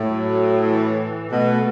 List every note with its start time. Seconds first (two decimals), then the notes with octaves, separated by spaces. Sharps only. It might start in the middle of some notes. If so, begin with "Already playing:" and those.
Already playing: A2
0.09 F#3
0.71 E3
1.31 B2 A3